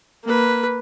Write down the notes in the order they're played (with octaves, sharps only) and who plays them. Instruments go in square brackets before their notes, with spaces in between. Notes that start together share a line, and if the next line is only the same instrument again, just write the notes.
[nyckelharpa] A#3 B4